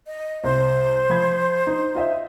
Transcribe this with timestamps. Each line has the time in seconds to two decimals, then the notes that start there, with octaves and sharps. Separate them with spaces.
0.07 D#5
0.44 C2 C5
1.10 F3 B5 G#6
1.67 D#4
1.95 F4 D#5 E5